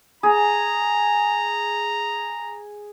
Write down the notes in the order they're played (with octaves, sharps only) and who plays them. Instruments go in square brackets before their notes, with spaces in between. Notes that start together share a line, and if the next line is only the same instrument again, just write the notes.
[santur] G#4 [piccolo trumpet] A#5